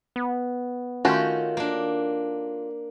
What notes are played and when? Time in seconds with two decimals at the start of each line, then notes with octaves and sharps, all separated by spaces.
0.16 B3
1.05 D#3 A3 C#4 F4 F#4 G5
1.57 A#3 D4